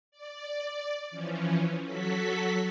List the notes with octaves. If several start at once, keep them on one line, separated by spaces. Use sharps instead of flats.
D5
E3 F3 C#4
F#3 F#4 A4 B6